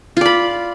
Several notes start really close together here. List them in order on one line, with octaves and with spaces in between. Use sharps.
F4 D5 B5